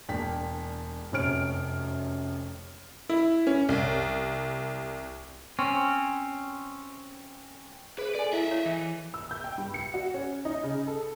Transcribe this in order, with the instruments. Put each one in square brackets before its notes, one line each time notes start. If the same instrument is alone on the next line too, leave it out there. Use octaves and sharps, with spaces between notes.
[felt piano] E1 A#3 D4 G5 B6
F1 F#2 C3 C#5 F6 D7
[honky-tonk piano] E4
C#4
C2
[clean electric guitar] C4 C#4
[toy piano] G#4 C5 [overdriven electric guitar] B4
[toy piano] A4 G#5 [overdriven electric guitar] D5
[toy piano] E4 [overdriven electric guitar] D#5 E5
[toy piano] E4 C#5
[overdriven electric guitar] E3
[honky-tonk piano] E6
G6
G5
G2
C#7
F#4
C#4
D#4
C#3
A4